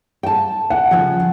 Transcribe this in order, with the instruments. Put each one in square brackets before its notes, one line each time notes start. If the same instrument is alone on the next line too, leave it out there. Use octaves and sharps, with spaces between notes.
[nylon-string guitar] G5 A5
[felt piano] F#5
[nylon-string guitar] C#3 F3